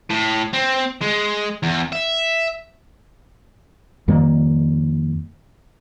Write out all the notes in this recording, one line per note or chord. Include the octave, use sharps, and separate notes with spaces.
A2
C4
G#3
E2
E5
F2 D#3 G3 A#3